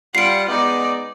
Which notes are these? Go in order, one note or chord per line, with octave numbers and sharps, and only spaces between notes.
G3 F4 F#5 C7 D7
G#3 B3 D#4 D5